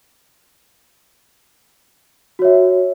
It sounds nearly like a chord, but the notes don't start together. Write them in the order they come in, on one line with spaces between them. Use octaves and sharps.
F#4 C#5 E5